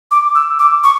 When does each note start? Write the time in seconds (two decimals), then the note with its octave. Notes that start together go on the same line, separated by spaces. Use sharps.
0.11 D6
0.35 E6
0.59 D6
0.84 C#6